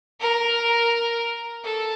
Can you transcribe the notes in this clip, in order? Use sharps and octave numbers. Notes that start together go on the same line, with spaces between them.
A#4
A4